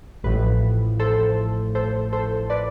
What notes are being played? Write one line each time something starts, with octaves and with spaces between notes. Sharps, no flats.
A1 A2 F3 B4
A4 C5
A4 C5
A4 C5
B4 D5